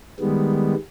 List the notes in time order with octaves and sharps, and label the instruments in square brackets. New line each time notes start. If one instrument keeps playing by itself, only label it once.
[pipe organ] D#3 G3 G#3 B3